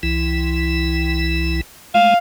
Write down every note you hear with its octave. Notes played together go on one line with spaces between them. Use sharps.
C2 E3 E4
G#3 A3 F5